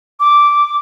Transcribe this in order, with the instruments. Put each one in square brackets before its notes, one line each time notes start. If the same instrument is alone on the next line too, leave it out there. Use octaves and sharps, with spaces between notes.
[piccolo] D6